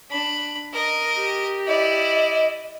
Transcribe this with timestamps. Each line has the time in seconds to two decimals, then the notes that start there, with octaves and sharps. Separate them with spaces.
0.10 D4 B5
0.73 A#4 D#5
1.15 G4
1.67 E4 D5 D#5